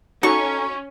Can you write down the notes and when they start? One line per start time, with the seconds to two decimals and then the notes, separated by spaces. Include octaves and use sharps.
0.23 C#4 D#4 F#4 A4 A#5 C#6